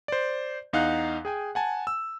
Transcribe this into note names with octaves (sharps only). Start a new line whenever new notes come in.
C5 D5
E2 D#4 F5 F#5 F#6
G#4 G5 G#5
F#5 G#5 A5
E6